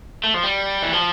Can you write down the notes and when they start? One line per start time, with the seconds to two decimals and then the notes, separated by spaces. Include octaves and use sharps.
0.24 A3
0.34 F3
0.44 G3
0.82 E3
0.93 F3